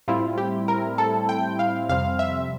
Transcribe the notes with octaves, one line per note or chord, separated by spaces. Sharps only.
A2 G3 C4 E4 F4
G4
A#4
A4
G5
F5
F2 C3 G3 C4 F5
E5